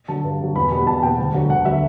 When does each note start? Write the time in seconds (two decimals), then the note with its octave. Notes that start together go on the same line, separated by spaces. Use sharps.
0.08 D3 F#3 A5
0.24 G2
0.41 D3 F#3
0.56 E2 B5
0.71 B2 G3 B3 B5
0.87 E2 A5
1.03 B2 G3 B3 G5
1.18 D2
1.34 D3 F#3
1.50 D2 F#5
1.65 D3 F#3 E5